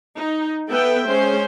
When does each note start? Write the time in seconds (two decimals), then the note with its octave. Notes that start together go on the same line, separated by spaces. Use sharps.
0.17 D#4
0.68 B3 A4 B4 E5 G5
1.07 G#3 C#4 C5